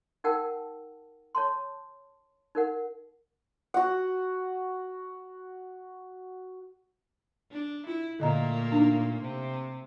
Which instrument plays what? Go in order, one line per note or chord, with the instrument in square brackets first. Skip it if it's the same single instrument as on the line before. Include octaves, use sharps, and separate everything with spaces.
[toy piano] D#4 A#4 F#5 G5 A5 E6
C#5 A5 C6
D#4 A#4 F#5
[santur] F#4 F#5
[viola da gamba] D4
[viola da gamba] E4 [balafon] F4
[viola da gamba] A#2 A3 A#3 [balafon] D3 D#5 A#5
[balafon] D4 D#4
[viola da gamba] C3